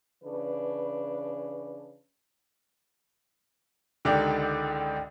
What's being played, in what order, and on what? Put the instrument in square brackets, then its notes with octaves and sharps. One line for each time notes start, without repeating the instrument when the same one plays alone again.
[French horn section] C#3 E3 D4 B4
[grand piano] C#2 D3 D#3 G4 D5